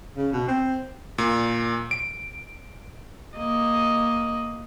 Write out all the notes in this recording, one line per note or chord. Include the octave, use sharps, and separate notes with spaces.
C#3
B2
C4
A#2
D7
A#3 D#5